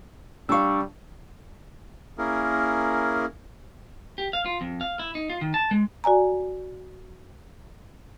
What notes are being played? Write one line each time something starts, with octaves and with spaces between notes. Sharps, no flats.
G3 D4 F5 C#6 E6
A#3 C#4 E4 G#4 A#4
G4
F5
F4
F2
F5
E4
D#4
F4
D#3
A5
G#3
F#4 D5 G#5 A#5